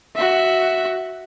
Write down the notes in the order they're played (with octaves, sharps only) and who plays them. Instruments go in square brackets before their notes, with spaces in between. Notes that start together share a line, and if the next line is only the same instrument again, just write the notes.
[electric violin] F#4 E5